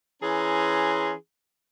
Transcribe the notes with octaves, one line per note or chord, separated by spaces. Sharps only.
E3 C#4 G#4 A#5 C6